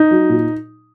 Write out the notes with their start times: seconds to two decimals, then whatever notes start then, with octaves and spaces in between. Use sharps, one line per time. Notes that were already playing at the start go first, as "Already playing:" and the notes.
Already playing: D#4
0.11 F#3
0.29 A#2